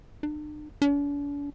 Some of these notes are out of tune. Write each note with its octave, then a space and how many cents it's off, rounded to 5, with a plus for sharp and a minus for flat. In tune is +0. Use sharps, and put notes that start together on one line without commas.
D4 +45
D4 -45